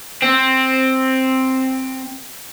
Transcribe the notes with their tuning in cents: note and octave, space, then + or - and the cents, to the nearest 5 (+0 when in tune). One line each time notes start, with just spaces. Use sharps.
C4 +5